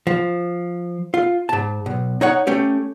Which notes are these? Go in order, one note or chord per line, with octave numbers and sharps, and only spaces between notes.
F3
F4
G#2 A5
B1
D#4 C#5 F#5
A3 C#4 G4